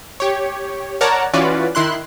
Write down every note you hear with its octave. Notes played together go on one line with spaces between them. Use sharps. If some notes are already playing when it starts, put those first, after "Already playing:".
G4 C#5
A#4 C#5 D5 F#5 A5 A#5
E3 C#4 F4 F#4 B4 D5
D#3 E4 C6 F#6